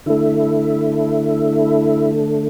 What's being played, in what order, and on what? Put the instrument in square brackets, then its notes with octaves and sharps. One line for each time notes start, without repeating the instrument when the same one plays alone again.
[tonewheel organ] D3 A3 E4